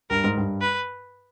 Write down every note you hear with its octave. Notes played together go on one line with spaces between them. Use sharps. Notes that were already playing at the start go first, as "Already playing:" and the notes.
G2 A#4
G#2
G2
B4